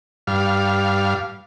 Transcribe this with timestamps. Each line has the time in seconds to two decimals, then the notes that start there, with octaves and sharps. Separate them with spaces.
0.27 G2 F5